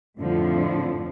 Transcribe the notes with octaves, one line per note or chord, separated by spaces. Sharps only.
F2 A2 D3 F3